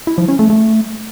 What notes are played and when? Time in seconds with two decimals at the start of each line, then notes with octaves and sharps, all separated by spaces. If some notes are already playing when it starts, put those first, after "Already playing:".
0.07 E4
0.18 F3
0.28 C#4
0.39 A3
0.50 A3